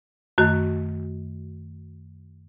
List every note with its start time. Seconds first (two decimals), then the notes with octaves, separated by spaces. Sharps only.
0.38 F#2 D#3 A3 F#4